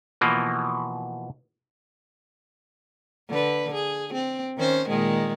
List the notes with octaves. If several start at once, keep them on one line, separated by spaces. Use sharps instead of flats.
B2 E3 F3 A#3
D3 B4
G#4
C4
D#3 C#4 C5
A#2 D#3 G#3